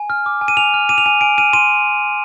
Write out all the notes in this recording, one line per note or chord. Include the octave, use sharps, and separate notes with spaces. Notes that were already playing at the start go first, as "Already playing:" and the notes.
Already playing: G#5
F6
D6
G#5
D#7
G#5 F7
F6
D6 D#7
F7
G#5 D#7
G#5 D7
F6 D#7
C6 D#7